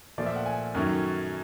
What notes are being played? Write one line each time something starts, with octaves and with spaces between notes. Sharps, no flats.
A#2 F3 A3 D5
E5
F#5
G#5
F#2 D#3 F#3 A3 C#4